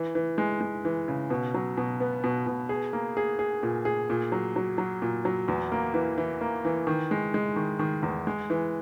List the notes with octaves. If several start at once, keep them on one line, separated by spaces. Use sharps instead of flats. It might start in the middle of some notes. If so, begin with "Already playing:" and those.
Already playing: E3
E3
G#3
G#3
E3
C#3
B2
F#3
B2
B3
B2
B2
G#4
A#3
G#4
G#4
A#2
G#4
A#2
F#3
F#3
F#3
A#2
F#3
E2
A#3
E3
E3
A#3
E3
D#3
G#3
G#3
D#3
D#3
E2
G#3
E3